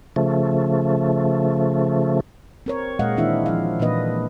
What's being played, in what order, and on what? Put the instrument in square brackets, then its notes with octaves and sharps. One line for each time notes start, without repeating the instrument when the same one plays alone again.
[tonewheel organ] C#3 F3 A3
[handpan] C4 A#4 C#5
A#2 G#3 D#5 F5 F#5
D#3 E3 C4 D4 E4 E5
F3 F5
A#2 E3 A#3 D4 B4 D#5